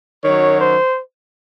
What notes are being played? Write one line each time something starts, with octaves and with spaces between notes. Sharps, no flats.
F#2 D#3 F#3 C#5
C5